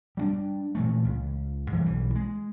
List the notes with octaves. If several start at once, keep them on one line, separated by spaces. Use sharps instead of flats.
G3 C4 D4
A#2 E3 A3
C#2
G2 E3 G3 G#3
B1 E3
G#3